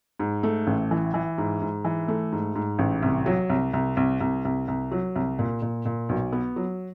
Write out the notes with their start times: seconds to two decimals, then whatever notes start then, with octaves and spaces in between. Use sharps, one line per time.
0.19 G#2
0.43 A3
0.67 A1
0.91 E3
1.14 E3
1.38 G#2
1.62 G#2
1.85 E3
2.08 A3
2.32 G#2
2.55 G#2
2.79 A1
3.02 C2
3.26 F#3
3.49 C2
3.73 C2
3.97 C2
4.20 C2
4.45 C2
4.68 C2
4.91 F#3
5.15 C2
5.39 A#2
5.62 A#2
5.85 A#2
6.09 B1
6.32 B3
6.56 F#3